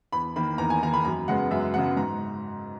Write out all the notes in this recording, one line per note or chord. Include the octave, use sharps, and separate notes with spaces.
E2 B5
D#3 A#3 B5
E2 A#5
G#5
D#3 A#3 A#5
B5
F#2 A#5
C#3 G#3 B3 F#5
F#2 E5
C#3 G#3 B3 F#5
G#2 A#5